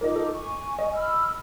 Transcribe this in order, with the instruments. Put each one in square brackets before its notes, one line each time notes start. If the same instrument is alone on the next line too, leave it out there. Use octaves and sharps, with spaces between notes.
[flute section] D#4 F4 D6 [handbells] A#4 D#5
[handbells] A4
[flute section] G#5 C#6
[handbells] D#5
[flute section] B5 E6 F6